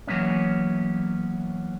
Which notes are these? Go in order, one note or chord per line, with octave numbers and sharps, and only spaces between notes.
E3 F#3 A#3 B3 C#4